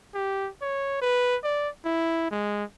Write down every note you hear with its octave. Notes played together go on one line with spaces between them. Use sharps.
G4
C#5
B4
D5
E4
G#3